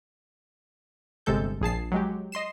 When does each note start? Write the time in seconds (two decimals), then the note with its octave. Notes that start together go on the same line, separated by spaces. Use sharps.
1.26 G1 C3 G#3 A4 G6
1.61 A#1 G#4 A5 C7
1.92 F#3 G#3 G4
2.32 D#5 C6 C7 E7